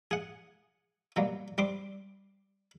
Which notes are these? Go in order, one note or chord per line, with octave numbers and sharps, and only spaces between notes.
G#4 F#5
B2 F#3 G3 A#3
G3 C4 C6 D6